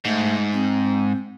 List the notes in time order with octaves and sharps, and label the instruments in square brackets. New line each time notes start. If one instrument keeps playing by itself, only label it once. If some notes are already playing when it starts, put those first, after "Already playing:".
[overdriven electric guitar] G#2 [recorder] A3
[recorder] C4